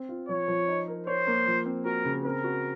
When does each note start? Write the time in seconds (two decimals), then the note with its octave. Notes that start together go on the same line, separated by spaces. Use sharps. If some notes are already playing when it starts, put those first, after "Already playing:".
Already playing: C4
0.09 F4
0.28 F3 C#5
0.48 F3
0.68 D#4
0.88 A#4
1.07 C5 C#5
1.27 A#3
1.47 F3
1.66 C4
1.85 F#4 A#4
2.05 C#3
2.25 C4 A#4
2.44 F#4